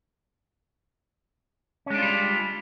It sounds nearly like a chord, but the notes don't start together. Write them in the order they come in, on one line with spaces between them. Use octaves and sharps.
C#4 G#3 D4 F4 G3